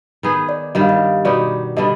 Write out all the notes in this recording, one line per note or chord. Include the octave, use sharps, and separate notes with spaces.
D#3 B3 D#4 G#4
D5
G2 D#3 G3 D#5
F5
D#5
B2 B3 D#4 G4 D5
D3 G3 B3 D4 D#5